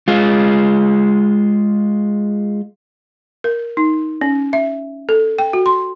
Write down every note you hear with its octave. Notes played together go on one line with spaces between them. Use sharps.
G#3 F4
A#4
D#4
C#4
E5
A4
G5
F#4
C6